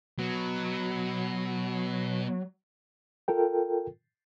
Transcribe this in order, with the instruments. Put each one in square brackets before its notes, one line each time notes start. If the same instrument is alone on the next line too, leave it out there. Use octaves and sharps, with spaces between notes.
[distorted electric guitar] B2 B3 [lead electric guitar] F#3
[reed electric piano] F4 A4 A#4 G5